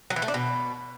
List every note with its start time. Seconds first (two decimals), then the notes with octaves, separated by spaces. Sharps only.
0.10 F#3
0.16 E3
0.22 A3
0.28 D4
0.34 B2